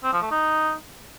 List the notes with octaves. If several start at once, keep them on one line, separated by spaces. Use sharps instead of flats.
C4
F3
A3
D#4